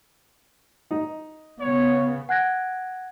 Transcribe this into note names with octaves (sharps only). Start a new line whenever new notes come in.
D#4
C#3 B3 C#5
F#5 G#5 F#6 G#6 A#6 D7